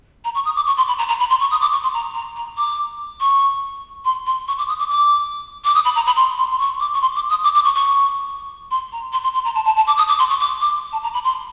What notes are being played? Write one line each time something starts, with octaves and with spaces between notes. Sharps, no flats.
A#5
C#6
D#6
D6
C#6
C6
B5
A#5
A#5
B5
C6
C#6
D#6
D6
C#6
C6
A#5
A#5
A#5
D6
C#6
C6
C6
C#6
D6
D#6
D6
D6
D6
D#6
B5
A#5
B5
C6
C6
C6
C#6
D6
C#6
C6
D6
D#6
D6
D6
C#6
C#6
C6
A#5
C6
C6
C6
A#5
A5
A5
A5
D6
D#6
D6
C6
C#6
D6
D6
A5
A#5
B5
C6